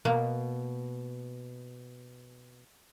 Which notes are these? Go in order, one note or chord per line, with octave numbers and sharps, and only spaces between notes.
B2 A#3